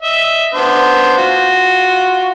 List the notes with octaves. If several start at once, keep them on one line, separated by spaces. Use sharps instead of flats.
D#5 E5
B3 D4 C5
F4 F#4